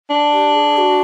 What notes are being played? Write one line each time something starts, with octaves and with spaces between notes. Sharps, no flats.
D4
G4
G#4
F#4